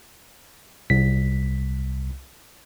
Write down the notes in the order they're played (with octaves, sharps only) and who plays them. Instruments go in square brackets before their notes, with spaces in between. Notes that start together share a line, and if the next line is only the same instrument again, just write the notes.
[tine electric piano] C2 B6